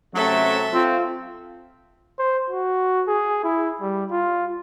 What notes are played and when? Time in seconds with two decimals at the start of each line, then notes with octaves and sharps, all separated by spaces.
0.15 C3 F#3 A3 C#4 A4 E5
0.73 C4 F4
2.19 C5
2.50 F#4
3.08 G#4
3.44 E4
3.82 G3
4.11 F4